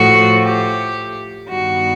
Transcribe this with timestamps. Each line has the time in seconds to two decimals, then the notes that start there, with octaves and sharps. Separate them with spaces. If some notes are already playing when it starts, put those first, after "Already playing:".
Already playing: A2 F3 A3 F#4
0.44 G4
1.48 G2 D#3 G3 B3 F#4